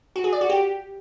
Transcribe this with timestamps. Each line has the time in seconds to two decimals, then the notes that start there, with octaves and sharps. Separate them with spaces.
0.16 F#4
0.24 G#4
0.33 D5
0.41 F#4
0.50 G4